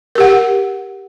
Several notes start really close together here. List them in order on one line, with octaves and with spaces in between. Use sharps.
A#4 G4 F#5